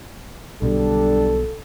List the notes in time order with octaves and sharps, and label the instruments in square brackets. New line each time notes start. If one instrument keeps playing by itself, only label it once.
[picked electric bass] B1 B2 D3 [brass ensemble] G3 D4 [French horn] A4